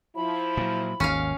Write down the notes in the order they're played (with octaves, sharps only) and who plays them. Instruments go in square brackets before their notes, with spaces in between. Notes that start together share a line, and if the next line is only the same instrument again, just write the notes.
[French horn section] F3 E4 [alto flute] B5
[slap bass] A#2 F#3
[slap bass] G#1 D#2 [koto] C#4 F5